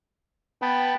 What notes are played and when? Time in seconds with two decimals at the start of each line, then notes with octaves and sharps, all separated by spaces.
0.62 B3 G5 A5 B5